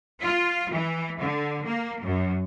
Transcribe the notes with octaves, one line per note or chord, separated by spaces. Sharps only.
F4
E3
D3
A#3
F#2